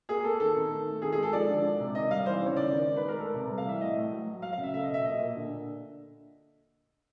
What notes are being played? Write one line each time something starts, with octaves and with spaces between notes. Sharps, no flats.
A#3 G#4
A#3 A4
D#3 A4
D#3
A3
A3
D#3 G#4
G#4
G#3
A4
F3 D5
D3
G#3
C3
D#3 D#5
G3 F5
E3 C5
C#3 C#5
D#3 D5
D#3
G#3
B4
G#3
A#4
A3 A4
C3
G3
F5
E3 E5
A2 D#5
A2
F#3
F#3
F#3 F5
F5
C#3
E5
A3 E5
D#5
B2 E5
A#2 D#5
A#2
D3